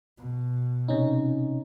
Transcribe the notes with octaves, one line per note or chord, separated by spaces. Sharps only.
B2
C3 C#4 D#4